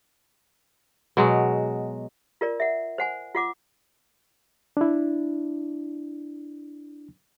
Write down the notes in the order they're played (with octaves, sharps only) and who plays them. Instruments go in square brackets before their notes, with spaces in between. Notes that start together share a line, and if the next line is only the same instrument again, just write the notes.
[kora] B2 F#3 G#3
[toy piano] F4 A#4 D5
E5 F#5
C5 F#5 G#5
F4 F#5 D6
[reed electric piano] D4 E4